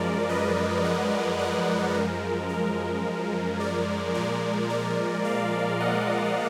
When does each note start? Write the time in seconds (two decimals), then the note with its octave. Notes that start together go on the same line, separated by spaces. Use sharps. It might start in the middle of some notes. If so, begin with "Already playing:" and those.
Already playing: F#2 F3 G#3 A#4 D5
0.29 B4 D#5
0.84 D#5 F#5
1.39 D#5 F#5
1.94 F#2 F3 G#3 A#4
2.49 A#4
3.60 A#4 D5
4.14 A#2 F3 G#3 A#4 D5
4.70 A#4 D5
5.24 D5 F5
5.80 D#5 F#5